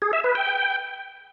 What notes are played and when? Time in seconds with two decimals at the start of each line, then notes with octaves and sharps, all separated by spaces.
0.02 G#4
0.13 E5
0.24 B4
0.35 G5